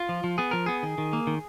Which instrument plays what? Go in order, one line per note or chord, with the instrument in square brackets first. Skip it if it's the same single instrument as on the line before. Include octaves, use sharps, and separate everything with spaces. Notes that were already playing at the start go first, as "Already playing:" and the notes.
Already playing: [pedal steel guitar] F4
F3
F3
B3 G#4
F3 A#4
B3 G#4
D#3
D#3
A#3
D#3